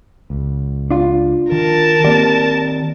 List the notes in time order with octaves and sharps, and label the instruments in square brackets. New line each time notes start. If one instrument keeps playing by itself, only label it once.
[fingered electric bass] C#2
[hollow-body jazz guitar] D4 F4
[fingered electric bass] D#3 [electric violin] A#4 A5
[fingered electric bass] D#3 A#3 C4 [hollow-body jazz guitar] G4 D5